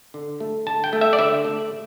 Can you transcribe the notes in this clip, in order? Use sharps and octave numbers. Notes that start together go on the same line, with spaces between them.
D3
A3
D3 A5
G5
A3
E5
D5
D3 E5
A3